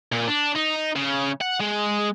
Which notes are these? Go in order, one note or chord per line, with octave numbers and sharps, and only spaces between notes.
A#2
D4
D#4
C#3
F#5
G#3